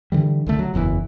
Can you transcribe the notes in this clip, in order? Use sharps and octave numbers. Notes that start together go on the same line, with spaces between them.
D3 E3 G3
C2 D3 A3
F#3
F#1 E2 G#2 E3